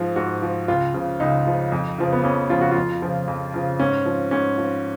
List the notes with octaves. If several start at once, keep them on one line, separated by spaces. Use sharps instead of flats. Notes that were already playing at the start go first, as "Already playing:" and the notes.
Already playing: G#2 F3 G#4
G#2 F#4
F3
C#2 F4
C#3 F3
C#2 D#4
C#3 F3
F2
C#3 F3
B3
F2 C#4
C#3 F3 F4
F#4
F2 F4
C#3 F3
F2
C#3 F3
G#2 C#4
F3
G#2 C#4
F3